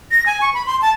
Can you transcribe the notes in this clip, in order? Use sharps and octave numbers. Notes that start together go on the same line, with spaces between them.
A#6
G#5
C#6
B5
C6
A5